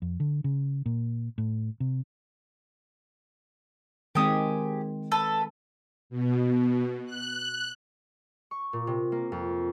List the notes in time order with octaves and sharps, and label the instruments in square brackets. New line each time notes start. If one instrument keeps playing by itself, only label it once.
[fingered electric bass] F2
D3
C#3
A#2
A2
C3
[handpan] D#3 G#3 C4 [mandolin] G4 G#5 D#6
[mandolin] A4 B4
[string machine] B2
F#6
[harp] C#6
A#2
C3
A#3
F2